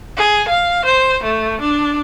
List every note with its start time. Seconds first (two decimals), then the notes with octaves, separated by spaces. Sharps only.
0.17 G#4
0.48 F5
0.85 C5
1.23 A3
1.61 D4